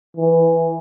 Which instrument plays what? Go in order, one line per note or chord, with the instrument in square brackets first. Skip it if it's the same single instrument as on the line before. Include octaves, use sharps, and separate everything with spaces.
[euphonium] E3